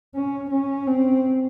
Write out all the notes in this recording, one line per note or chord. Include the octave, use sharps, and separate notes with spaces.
C#4
C#4
C4